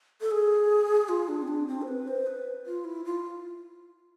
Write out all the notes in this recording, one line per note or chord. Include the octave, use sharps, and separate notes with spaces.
A4
G#4
F4
D4
C4
D4
C4
C5
B4
C5
B4
F4
E4
F4